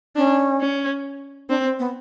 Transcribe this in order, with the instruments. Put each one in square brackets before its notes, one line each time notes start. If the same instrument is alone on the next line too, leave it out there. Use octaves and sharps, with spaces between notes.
[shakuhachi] C#4 [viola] D4
[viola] C#4
[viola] C4 [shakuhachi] D4
[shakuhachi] C4
B3